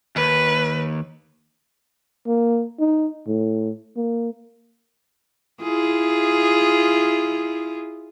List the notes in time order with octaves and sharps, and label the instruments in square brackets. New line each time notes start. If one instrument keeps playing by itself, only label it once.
[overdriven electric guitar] D#2 [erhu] B4
[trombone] A#3
D#4
A2
A#3
[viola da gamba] E4 F4 G#4